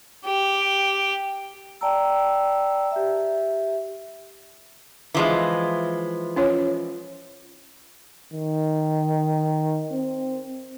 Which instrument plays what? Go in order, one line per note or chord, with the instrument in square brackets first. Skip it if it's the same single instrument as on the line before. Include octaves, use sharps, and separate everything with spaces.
[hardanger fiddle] G4
[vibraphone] D5 G5 A5 A#5 E6
G4 E5
[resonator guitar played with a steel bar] E3 F3 G#3
[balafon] C#4 F4 C#5
[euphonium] D#3
C4